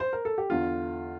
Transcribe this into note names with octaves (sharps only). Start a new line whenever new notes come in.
C5
A#4
A4
G4
E2 D3 F4